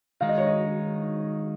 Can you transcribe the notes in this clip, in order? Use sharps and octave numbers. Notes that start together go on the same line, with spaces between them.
D#3 G#3 D#4 F5
D#5
C#5
D#5